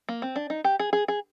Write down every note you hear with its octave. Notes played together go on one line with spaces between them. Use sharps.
A#3
C4
D4
D#4
G4
G#4
G#4
G#4